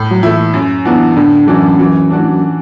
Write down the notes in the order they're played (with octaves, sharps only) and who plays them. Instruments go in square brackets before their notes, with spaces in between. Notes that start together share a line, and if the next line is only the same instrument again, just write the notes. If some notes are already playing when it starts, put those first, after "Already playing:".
Already playing: [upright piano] A2
[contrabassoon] F#3
[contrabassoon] E3 [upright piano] A3 E4
[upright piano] F#2
[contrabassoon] E3 [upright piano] F#3 B3 D4 F#4
[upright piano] A2 [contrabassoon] D3
[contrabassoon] F#2 [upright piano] E3 D4 F#4
[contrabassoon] F#2 [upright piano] E3
[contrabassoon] F#2 [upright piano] D4 F#4
[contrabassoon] A2
F#2